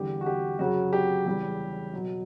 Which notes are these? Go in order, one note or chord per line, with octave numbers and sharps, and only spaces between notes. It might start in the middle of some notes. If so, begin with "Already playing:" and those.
Already playing: E2 D3 G3 G4
F#4
G4
F#2 C#3 F#3 F#4
G4
E2 C#3 G3
B2 F#3